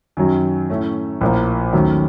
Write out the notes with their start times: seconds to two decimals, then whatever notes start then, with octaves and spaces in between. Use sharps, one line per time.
0.17 F#2 D#3 F#3
0.70 A2 A3 C#4
1.21 A#1 A2 F3 A#3
1.73 D#2 D#3 F#3 A3 C#4